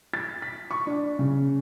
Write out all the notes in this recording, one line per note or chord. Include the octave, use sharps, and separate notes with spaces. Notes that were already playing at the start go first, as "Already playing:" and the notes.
A6
B6
C#6
D4
C#3